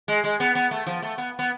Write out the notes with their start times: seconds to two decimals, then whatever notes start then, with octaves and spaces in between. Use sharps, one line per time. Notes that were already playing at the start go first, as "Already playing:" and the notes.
0.08 G#3
0.24 G#3
0.40 B3
0.55 B3
0.71 A3
0.87 F3
1.02 A3
1.18 B3
1.39 B3